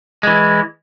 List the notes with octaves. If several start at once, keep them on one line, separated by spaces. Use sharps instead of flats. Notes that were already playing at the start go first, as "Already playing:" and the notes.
E3 G#3